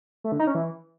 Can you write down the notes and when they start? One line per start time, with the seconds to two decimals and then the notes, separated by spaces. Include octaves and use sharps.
0.24 A3
0.32 D3
0.40 D#4
0.47 C#4
0.55 E3